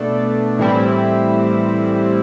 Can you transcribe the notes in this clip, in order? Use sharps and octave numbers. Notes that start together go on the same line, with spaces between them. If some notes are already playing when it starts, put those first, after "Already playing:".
Already playing: B2 A3 D4
A2 E3 G3 C4 E4